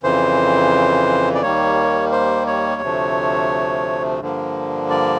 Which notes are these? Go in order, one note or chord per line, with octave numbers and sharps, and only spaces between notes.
F2 C#3 E3 C5
D5
D#2 D#3 G3 A#3 C#5
C5
C#5
D2 C3 F3 A3
G2 D3 F3 A#3
D5